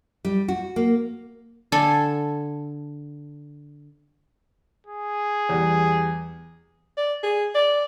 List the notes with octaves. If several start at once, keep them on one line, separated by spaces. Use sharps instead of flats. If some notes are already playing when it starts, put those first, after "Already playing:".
G3
F#4
A#3
D3 A4 G#5
G#4
E2 G3
D5
G#4
D5